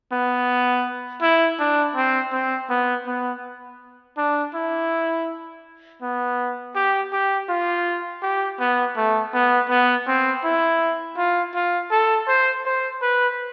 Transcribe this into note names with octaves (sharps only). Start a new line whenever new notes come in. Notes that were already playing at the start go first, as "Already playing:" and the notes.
B3
E4
D4
C4
C4
B3
B3
D4
E4
B3
G4
G4
F4
G4
B3
A3
B3
B3
C4
E4
F4
F4
A4
C5
C5
B4